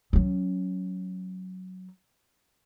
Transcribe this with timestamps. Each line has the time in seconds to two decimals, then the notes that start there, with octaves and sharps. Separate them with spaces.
0.13 F#3 C#4